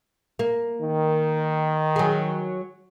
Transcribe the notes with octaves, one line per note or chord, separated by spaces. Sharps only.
A#3
D#3
F#3 G#4